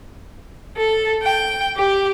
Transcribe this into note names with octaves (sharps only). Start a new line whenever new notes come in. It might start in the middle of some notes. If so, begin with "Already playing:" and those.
A4
G5
G4